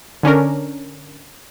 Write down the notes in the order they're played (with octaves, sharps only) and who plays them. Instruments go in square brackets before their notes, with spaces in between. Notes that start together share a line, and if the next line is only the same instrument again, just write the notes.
[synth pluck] D3 C#4 D4 A#4